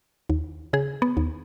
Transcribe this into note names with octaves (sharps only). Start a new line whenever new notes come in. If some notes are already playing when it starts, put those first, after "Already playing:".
D#2
C#3 G#4
B3
D#2